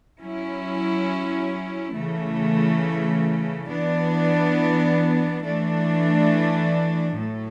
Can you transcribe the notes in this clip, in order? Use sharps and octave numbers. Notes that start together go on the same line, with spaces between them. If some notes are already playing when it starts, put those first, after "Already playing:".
F#3 C#4 E4
C#3 E3 A3
E3 B3 D4
E3 A3 D4
A2 F#3 A3